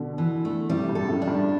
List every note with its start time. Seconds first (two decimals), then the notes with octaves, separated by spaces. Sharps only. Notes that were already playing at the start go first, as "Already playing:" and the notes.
Already playing: B2 D3
0.18 E3
0.45 A3
0.69 A2 C3 G3
0.88 G2 B2
0.95 A4
1.08 F#2 A2
1.22 D4
1.28 G2